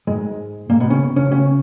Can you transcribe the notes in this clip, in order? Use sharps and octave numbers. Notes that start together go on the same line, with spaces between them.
G#2 G#3
A#2 A#3
B2 B3
C#3 C#4
C#3 C#4
C#3 C#4